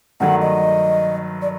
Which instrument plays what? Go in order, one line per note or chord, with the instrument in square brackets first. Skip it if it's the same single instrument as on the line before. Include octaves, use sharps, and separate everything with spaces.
[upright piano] G2 D#3 F#3 A3 [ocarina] F#5
[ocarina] D#5
D5